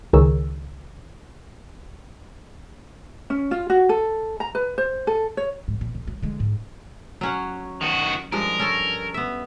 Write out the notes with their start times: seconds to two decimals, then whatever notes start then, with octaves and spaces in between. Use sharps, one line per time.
0.13 C#2 D#3 G#4 A#4 C#5 E6
3.30 C#4
3.51 F4
3.70 F#4
3.89 A4
4.40 A#5
4.55 B4
4.78 C5
5.07 A4
5.37 C#5
5.68 G#2
5.81 A#2
5.95 D2
6.08 F#3
6.22 D3 G#3
6.40 G#2
7.21 F#3 C#4 F#5
7.81 D#3 F#4
8.32 G2 F3 G#3 A#4
8.59 C#4 A4 C#5
9.14 B3 E5